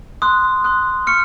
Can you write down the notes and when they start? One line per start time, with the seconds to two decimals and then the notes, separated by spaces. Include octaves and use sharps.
0.22 C6 D#6 F#6
0.64 C6 D#6 F#6
1.07 C#6 F6 C#7